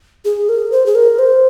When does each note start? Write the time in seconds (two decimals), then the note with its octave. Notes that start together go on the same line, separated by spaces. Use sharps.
0.25 G#4
0.49 A#4
0.72 C5
0.86 G#4
0.95 A#4
1.19 C5